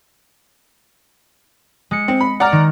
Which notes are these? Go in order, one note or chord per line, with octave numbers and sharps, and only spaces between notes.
G#3 C#7
C4
B5
D5 F#5 A#5 F6
D#3